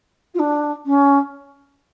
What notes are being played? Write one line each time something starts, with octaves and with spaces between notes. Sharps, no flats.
F4
D4
C#4